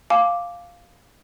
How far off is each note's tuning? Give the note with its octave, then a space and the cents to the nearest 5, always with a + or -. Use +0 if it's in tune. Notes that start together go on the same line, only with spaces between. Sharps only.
F5 +0 G#5 +35 D6 +0